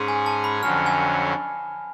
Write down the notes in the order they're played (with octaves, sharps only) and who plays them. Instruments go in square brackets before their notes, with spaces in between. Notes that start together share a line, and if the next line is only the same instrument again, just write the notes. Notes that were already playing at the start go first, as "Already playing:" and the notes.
Already playing: [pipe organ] G#2 G#3 C#4 G#4
[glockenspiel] G#5
A5
B5
[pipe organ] F2 D3 F#3 C#4 [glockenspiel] F6
[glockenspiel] G#5